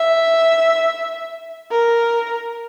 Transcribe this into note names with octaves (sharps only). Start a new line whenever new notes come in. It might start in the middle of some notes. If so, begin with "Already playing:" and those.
Already playing: E5
A#4